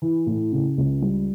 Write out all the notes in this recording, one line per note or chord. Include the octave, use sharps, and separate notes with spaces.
E3
A2
C#3
C#2
G3